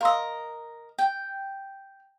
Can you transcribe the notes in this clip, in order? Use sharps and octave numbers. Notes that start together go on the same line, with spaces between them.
A#4 D#5 F5 C6 E6
G5